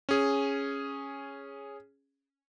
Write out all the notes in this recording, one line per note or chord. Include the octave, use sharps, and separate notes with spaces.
C#4 G#4